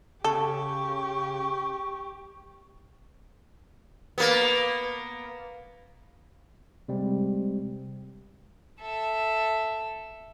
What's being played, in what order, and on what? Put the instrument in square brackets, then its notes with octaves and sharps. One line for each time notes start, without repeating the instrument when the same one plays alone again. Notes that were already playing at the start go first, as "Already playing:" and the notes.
[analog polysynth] C#3 [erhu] G4 [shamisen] A4 [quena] C#6
[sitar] A#3 B3
[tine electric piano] C3 G3 G#3 C4
[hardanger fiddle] A4 E5